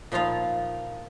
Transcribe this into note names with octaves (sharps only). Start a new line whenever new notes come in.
A#2 F3 D#4 F4 F5 B5